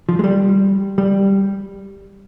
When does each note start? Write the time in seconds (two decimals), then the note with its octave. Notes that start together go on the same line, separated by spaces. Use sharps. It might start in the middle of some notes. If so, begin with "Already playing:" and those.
0.09 F3
0.19 G#3
0.24 G3
0.98 G3